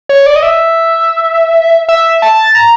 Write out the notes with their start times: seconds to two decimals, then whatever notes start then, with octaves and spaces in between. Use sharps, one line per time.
0.09 C#5
0.26 D5
0.36 D#5
0.43 E5
1.89 E5
2.22 A5
2.55 A#5